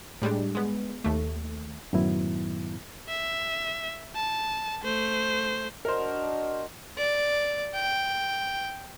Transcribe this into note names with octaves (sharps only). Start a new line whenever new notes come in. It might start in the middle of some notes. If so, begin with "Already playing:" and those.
A2 G3 G#3 D4
G#3 B3
D#2 A3
F#2 A2 D#3 F#3 B3 E4
E5
A5
A3 C5
D4 F#4 A#4 C5 D#5
D5
G5